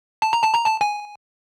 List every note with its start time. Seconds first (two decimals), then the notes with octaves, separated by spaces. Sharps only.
0.22 A5
0.33 A#5
0.43 A5
0.54 A#5
0.66 A5
0.81 G#5